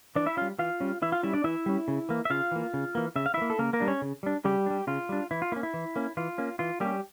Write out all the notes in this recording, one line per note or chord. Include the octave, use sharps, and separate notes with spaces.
E3 D4 D5
E4 E5
G3 C#4 F4 F5
E3 F4 F5
G3 C#4
E3 E4 E5
F4 F5
G3 C#4 E4 E5
D4 D5
E3 E4 E5
G3 C#4
C#3
E3 A#3
E5
C#3 F4 F5
E3 A#3
C#3
E3 A#3
C#3 E5
F5
E3 E4 E5
A#3
A4
C#3 A#3 A#4
A#3 A#4
G3 D4
C#4 C#5
C#3
G3 D4
C#3 G3 G4
G3 D4
C#3 F4
G3 D4
E3 E4
F4
A#3 C#4 E4
E4
E3
A#3 C#4
E3 F4
A#3 C#4
E3 F4
G3 A#3 C#4 G4